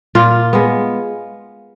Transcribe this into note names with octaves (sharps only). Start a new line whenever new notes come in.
A#2 F4
G#3 B3